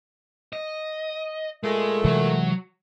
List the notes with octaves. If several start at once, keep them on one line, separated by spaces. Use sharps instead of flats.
D#5
A#2 G#3 A3
C3 E3 F#3 G#3 F#4